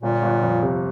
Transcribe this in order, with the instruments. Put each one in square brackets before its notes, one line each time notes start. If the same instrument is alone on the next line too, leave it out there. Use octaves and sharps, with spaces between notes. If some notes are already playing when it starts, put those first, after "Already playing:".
[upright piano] G1 [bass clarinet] A#2
[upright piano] G1
F2
C3